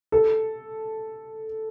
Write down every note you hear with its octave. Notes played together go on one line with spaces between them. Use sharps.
A4